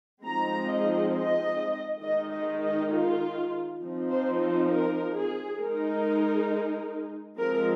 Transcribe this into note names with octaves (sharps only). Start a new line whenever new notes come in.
F3 G#3 C4 D#4 A#5
D#5
D#5
D#3 G#3 D#4 D#5
D#5
D#5
F4
F3 C4 D#4
C5
C5
A#4
G#4
G#3 D#4 A#4
F3 G#3 C4 A#4